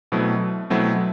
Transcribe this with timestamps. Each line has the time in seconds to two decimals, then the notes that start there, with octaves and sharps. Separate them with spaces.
0.12 B2 F#3 A3 C4 E4
0.70 B2 F#3 A3 C4 E4